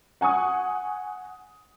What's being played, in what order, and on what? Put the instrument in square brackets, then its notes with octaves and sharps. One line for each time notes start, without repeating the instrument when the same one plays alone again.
[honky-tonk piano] F#5 G#5 C#6 D#6